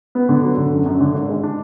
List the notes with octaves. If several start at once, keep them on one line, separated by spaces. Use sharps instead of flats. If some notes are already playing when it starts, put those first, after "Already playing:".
B3
D3
F#3
D3
F#2
F#2
D3
G#1
G#3
D4